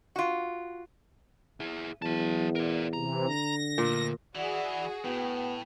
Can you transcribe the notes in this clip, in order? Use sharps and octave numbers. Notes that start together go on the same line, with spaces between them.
F4 F#4
E4 G#4
E2 F#3 A5
A#4 D5
C3 E3 A#5
D3 A#6
D2 A#2
E3 E4 F#4 G#4 D5 F#5
A2 B3 G5